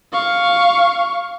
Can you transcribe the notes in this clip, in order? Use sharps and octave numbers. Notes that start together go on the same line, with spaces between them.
F5 C#6